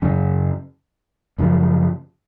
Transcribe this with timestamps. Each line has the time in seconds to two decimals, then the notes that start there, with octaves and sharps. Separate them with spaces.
0.02 F#2 C#3 F#3 C#4
1.38 F#2 C#3 F3